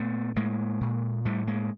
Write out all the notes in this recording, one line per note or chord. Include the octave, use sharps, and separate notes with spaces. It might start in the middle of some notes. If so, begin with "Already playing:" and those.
Already playing: A#2 A3 B3
A2 G#3 A#3
A#2
A2 G3 A3
G#3 A#3